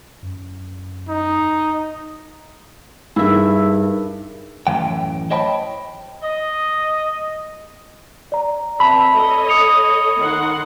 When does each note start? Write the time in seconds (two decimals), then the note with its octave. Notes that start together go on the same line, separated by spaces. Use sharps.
0.23 F#2
1.08 D#4
3.16 G2 D#4 E4 G#4 A#4 E5
4.67 F#2 A2 E3 G5
5.30 C5 C#5 D#5 G5 A5 B5
6.23 D#5
8.32 D5 A#5
8.80 C4 B4 E5 A5 B5
9.14 A4 C#5 D#5
9.49 D#6 C#7 F7
10.22 D#3 F#5 C6